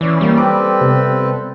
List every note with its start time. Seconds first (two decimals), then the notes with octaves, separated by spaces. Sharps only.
0.01 E3 C#4 D5
0.21 E3 G3 A#3
0.38 C4 A4 B4 D6
0.81 C3 B3